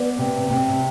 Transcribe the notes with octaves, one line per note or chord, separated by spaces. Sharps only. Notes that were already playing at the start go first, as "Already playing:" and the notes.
Already playing: B3 D5
C3
C3